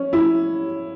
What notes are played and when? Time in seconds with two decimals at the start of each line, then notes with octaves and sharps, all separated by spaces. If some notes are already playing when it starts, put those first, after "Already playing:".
Already playing: C#4
0.13 E4